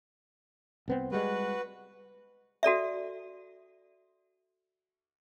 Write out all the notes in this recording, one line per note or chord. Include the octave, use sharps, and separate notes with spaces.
C2 B3 C4
G3 G#3 F#4 B4
F#4 A4 D5 E5